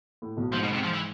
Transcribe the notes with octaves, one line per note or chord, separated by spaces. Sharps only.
A2
B1 B2
G#2 F3
B2
C3
F3
E3